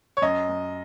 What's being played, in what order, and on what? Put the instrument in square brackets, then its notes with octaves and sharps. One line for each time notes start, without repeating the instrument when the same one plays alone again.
[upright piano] C#5
F#2 D#5
F#2